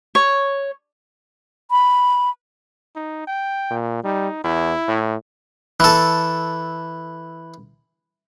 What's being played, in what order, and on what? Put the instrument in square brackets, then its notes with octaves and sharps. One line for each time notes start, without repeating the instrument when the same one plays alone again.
[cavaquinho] C#5
[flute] B5
[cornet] D#4
G5
[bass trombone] A#2
[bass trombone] G3 [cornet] D#4
[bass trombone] E2 [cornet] E4
[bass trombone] A2
[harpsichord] E3 A4